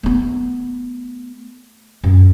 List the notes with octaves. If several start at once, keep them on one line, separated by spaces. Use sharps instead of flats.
A3 B3
F#2